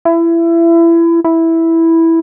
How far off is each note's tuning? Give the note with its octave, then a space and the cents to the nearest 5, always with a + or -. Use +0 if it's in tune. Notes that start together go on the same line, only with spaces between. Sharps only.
E4 +25
E4 -5